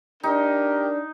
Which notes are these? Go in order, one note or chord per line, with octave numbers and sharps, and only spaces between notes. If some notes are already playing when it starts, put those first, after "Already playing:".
D4 D#4 G4 A#4